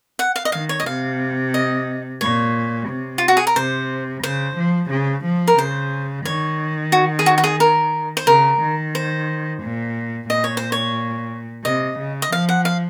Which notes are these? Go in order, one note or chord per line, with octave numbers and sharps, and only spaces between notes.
F#5
F5
D#5
D#3 F5
C#5
D#5
C3 F5
D#5
A#2 C#5
C3
F4
F#4
G#4
A#4
C3 C5
C#3 C5
F3
C#3
F3
A#4
C#3 C5
D#3 C#5
F#4
G#4
F#4
F#4
G#4
A#4
C5
C#3 A#4
D#3
C5
A#2
A#2 D#5
C#5
C5
C#5
C3 D#5
C#3
D#5
F3 F5
F#5
F5